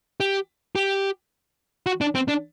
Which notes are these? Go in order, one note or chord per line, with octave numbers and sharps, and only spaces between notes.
G4
G4
F#4
D4
C4
D4